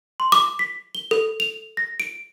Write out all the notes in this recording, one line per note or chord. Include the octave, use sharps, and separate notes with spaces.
C6
D6
B6
G7
A4
F7
A#6
D7